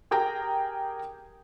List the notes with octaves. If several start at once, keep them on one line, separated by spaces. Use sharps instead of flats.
G4 G#4 A#4 G5 A#5